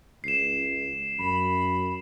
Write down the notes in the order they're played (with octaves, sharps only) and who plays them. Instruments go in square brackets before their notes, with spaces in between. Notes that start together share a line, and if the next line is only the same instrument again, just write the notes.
[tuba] C#2 [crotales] C7 E7
[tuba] F#2 [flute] B5